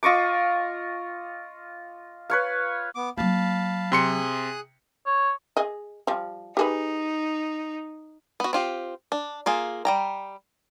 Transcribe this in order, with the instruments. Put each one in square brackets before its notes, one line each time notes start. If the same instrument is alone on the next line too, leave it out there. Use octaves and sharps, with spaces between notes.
[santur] F4 D#5 C#6 D6
B4 C#5 F5
[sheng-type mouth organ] B3 D6
[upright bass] F#3 A#3 [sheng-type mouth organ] F5 A5 B5
[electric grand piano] C3 C6 C#7 [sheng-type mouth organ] G#4 D#6 F#6
[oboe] C#5
[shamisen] G#4 D#5
F3 G3
[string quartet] D#4 [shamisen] G4 G#4 B4
[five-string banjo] B3 F#4
C4 F4 G4
D4
A#3 F4 G#4
G3 G5 A#5